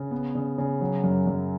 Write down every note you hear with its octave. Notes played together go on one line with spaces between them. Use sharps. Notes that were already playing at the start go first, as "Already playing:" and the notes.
Already playing: C#3
B3
C#3
C#3
F#3
F#2
F#2